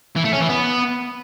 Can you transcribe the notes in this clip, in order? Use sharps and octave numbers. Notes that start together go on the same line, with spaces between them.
E3
A3
C#4
E3
B3